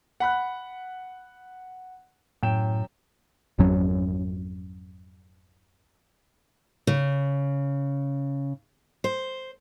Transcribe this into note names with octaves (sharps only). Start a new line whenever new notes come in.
F#5 B5 F#6
F#2 A2 G5 E7
G#1 F2 F#3 C#4
C#3
C5